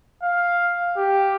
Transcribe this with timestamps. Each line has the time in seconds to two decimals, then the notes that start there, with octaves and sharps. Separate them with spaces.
0.23 F5
0.96 G4